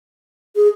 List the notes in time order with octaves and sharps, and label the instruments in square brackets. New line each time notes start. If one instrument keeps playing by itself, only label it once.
[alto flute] G#4